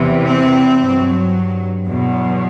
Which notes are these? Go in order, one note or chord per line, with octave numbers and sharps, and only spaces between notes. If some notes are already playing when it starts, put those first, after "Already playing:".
Already playing: E2 C3 E3
C4
G2 F#3
E2 B2 F#3